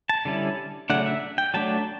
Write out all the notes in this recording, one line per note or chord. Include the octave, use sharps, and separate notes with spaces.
A5
D3 G3 C#4 E4
C#3 F#3 A3 D4 F#5
E5
G5
F#3 A3 D4 A5